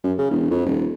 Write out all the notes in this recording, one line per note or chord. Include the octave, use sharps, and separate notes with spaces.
F#2
C#3
E1
F2
D#1